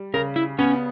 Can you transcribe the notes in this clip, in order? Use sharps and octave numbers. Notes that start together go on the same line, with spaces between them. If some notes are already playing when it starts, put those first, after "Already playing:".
Already playing: G3
C#3 A#4
E4
B3 C#4